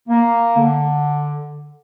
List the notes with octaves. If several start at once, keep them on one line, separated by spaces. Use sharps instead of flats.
A#3
D3